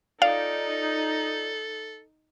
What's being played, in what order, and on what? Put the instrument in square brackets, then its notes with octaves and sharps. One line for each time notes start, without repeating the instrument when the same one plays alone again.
[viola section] D#4 [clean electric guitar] F4 D5 [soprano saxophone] A4 [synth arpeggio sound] F5